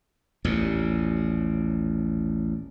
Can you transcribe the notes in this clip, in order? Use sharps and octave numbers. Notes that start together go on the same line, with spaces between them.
A1 D#2 A#2